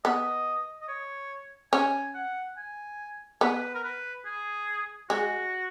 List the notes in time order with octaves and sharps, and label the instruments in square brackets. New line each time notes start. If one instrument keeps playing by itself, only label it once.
[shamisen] B3 [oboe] D#5
[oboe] D#5
C#5
[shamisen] C#4 [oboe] G#5
[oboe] F#5
G#5
[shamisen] B3 [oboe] B4
[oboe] A#4
B4
G#4
[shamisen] G#3 [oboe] F#4